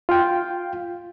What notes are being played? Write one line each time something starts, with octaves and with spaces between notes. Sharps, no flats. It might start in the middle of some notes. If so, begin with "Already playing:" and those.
F4 F5 G5